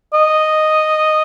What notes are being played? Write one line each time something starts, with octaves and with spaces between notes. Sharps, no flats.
D#5